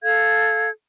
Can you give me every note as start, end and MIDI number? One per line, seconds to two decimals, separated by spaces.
0.03 0.69 69
0.03 0.69 77
0.03 0.69 92